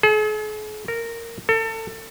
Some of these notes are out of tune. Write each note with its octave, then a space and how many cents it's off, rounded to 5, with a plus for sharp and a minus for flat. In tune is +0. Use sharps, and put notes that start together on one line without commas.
G#4 +45
A#4 -10
A4 +30